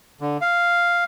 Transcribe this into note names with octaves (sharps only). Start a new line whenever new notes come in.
D3
F5